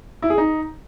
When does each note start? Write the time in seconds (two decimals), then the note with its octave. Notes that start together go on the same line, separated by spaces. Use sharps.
0.22 E4
0.30 G#4
0.38 D#4